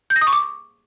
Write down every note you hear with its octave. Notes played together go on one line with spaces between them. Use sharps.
G6
A#6
D#6
C#6
D6